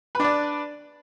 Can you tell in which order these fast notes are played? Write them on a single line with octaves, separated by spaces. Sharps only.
B4 D4 D5